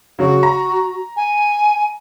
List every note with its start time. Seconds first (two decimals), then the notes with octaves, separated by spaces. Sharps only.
0.19 C#3 F#3 F#4
0.43 A#5
1.17 G#5